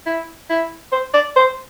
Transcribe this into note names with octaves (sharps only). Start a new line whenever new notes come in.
E4
E4
C5
D5
C5